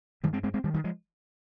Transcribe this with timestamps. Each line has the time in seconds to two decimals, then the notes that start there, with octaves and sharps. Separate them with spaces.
0.23 G2 D#3 G3
0.33 G#3 C4
0.43 G#3 C4
0.54 G#3 C4
0.64 D#3 G3
0.74 D#3 G3
0.84 F3 G#3